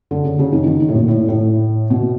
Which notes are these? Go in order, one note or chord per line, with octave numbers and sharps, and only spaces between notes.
D3
C#3
C#3
D#3
D#3
A2
A#2
A2
A2
B2